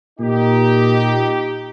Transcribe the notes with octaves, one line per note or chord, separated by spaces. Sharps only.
A#2 D#4 G4